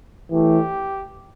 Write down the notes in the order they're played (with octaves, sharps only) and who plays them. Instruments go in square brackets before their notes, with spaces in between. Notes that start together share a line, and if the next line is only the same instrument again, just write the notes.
[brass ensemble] A2 E3 A3 G4